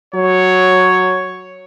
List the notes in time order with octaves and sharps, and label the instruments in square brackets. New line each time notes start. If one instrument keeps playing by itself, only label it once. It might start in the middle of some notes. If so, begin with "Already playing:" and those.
[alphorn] F#3 [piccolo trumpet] C#5